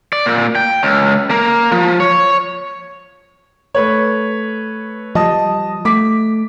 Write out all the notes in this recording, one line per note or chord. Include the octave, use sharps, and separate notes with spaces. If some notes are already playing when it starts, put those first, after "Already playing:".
D5
A#2
G5
C#2
A#3
F3
C#5
A3 B4 C#5
F3 G3 D#5 A5 D#6
A3 D6 B6